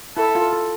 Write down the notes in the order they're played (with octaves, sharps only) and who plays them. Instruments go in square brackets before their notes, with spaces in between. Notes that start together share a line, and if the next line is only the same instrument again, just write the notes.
[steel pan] E4 [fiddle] A4
[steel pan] F4
A4